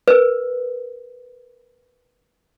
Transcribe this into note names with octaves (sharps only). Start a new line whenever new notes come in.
A#4 B4